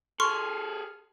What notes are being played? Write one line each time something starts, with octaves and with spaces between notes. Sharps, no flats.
G#4 A4 C6 C#6 F6